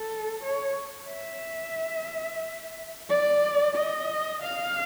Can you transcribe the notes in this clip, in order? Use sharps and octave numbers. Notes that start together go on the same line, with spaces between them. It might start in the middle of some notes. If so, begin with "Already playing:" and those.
Already playing: A4
C#5
E5
D5
D#5
F5